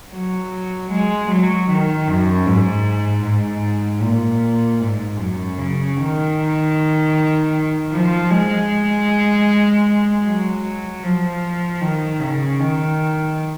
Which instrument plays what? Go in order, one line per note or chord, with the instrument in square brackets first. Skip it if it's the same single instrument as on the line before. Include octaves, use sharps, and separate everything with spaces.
[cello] F#3
G#3
F#3
D#3
F#2
G#2
G#2
A#2
G#2
F#2
C#3
D#3
F3
G#3
F#3
F3
D#3
C#3
D#3